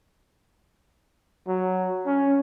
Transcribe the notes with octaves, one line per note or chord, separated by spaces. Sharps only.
F#3
C#4